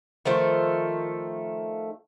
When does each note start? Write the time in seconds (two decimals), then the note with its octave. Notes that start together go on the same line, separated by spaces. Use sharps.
0.25 D#3 F3 A3 C5